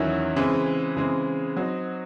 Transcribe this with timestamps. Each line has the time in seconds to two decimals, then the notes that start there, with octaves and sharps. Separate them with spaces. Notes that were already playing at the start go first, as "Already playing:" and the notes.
Already playing: E2 D#3 F#3 C#4 E4
0.36 C#3 E3 G#3 C4
0.96 C#3 E3 G#3 C4
1.57 F#3 C4 D#4